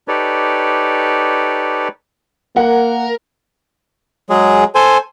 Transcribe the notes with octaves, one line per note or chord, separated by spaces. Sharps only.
D#4 G4 A4 B4 C#5 D5
A#3 A#4 F#5
F#3 G#3 G#4
A4 C5 G#5